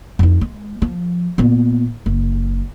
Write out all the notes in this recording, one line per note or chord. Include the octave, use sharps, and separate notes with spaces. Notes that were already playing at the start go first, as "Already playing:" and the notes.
F2 D#4
G#3
F3
A#2 B3
F#1